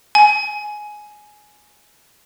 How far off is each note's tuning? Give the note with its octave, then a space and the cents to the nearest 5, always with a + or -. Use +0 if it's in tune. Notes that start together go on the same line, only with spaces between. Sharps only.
G#5 +10